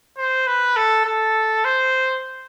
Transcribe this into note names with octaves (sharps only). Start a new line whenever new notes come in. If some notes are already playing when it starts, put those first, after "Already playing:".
C5
B4
A4
A4
C5